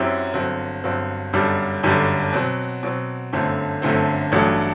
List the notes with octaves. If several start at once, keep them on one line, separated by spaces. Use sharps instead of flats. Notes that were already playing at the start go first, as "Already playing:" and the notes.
Already playing: F#2 F#3 C4 E4 G4
G1 G2 F#3 C4
G1 G2 F#3 C4
G1 F#2 D3 G3 D4
G1 F#2 D3 G3 D4
B2 F#3 C4
B2 F#3 C4
G1 F#2 D3 A3 C4
G1 F#2 D3 A3 C4
A1 G2 F#3 A3 D4